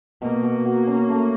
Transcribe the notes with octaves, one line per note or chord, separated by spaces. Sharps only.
B2 A#3
B2
F#4
C#4
A3